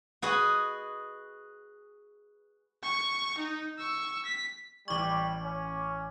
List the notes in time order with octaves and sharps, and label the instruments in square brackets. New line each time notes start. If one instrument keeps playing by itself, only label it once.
[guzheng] F#4 G#4 B4 D#5
[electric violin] C#6
D#4
C#6 E6
B6
[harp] A1 G#6 [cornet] G3 [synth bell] C#6 D6
[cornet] C#4